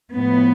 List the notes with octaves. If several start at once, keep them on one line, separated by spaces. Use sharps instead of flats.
A2 F3 B3